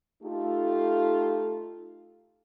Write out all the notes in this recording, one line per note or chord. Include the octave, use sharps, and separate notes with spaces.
A3 D#4 F4 G4 A4